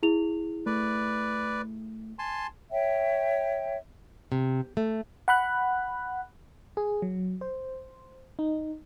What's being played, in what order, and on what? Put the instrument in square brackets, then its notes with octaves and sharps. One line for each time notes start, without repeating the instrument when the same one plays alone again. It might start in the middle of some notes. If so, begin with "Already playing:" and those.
[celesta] E4 G#4 F7
[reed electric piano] A3 [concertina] B4 D5
[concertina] G#5 A5 C6
[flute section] C#5 E5 G5
[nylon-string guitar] C3
A3
[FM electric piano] F#5 B5 F#6
G#4
F#3
C5
D#4